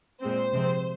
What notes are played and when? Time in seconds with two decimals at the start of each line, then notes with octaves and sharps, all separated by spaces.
0.22 A#2 G#3 C4 C5
0.53 C3 F3 G#3 C4